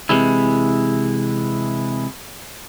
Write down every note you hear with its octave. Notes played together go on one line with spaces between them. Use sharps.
C3 E3 G#3 E4